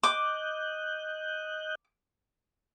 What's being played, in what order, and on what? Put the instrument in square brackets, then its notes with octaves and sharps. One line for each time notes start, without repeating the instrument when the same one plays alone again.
[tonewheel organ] D#5 F#6 G6 [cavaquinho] D6